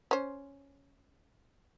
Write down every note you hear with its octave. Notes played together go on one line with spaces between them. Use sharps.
C#4 C5